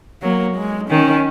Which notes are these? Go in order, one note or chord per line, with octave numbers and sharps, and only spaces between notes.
F#3 A#3
G#3
D#3 C#4